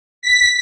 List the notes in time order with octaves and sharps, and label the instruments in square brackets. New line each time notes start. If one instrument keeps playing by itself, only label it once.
[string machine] B6